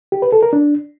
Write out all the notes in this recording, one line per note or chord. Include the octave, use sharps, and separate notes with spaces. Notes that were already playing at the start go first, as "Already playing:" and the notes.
G4
B4
A4
A#4
D4